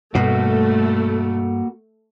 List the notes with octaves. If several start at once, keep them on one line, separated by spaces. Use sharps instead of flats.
G2 B2 A3 A#3 F#4